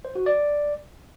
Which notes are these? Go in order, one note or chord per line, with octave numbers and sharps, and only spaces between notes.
C5
F#4
D5